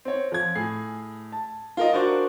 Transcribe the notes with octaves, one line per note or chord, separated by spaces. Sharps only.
C4 C#5
F3 G#6
A2 G#4 C7
A5
F4 A#4 D#5
D4 F#4 A#4 C5 D5 C#6